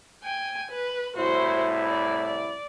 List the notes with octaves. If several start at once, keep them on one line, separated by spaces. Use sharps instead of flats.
G5 G#5
B4
C2 A2 E4 F#4 C5
D5
D5